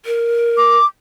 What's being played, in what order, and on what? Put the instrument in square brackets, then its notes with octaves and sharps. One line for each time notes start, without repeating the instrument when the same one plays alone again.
[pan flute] A#4
[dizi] D6